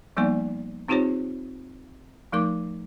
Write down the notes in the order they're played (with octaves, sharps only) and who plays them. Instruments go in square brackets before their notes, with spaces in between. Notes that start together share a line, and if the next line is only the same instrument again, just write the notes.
[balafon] F3 G3 A#3 B3 D#4 D5
C4 D#4 F4 G4 C5 C#5
F3 A3 D#4 A#4 D6